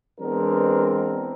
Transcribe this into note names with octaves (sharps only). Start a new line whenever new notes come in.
E3 G#3 B3 C4 D4 A#4